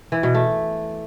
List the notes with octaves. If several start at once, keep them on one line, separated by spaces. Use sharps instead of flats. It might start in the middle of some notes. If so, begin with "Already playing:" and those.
E3
B2
A3